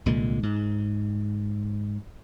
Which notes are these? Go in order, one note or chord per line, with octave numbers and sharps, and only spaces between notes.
C2 A#2 D3 G#3
G#2